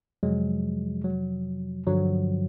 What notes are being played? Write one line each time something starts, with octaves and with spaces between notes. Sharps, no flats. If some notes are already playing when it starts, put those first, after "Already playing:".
F2 C3 F3 F#3 G#3
F#3
G2 D3 F3 F#3